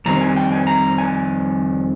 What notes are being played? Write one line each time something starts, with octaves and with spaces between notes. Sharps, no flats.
F2 D#3 G3 C4 A#5
G#5
G5
G#5
A#5
G#5